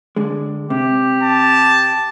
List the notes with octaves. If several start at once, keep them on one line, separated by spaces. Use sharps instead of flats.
D3 G#3
C3 G4
A5